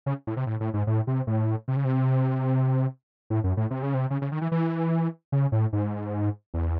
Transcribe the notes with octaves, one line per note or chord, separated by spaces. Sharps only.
C#3
A2
C3
A2
A2
G#2
A2
C3
A2
C3
C#3
C3
A2
F#2
A2
C3
C#3
C3
C#3
C#3
D#3
E3
E3
C#3
A2
G#2
E2